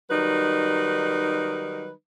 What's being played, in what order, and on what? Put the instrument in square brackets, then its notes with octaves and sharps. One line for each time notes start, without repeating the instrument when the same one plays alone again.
[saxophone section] D#3 F#3 G3 D#4 B4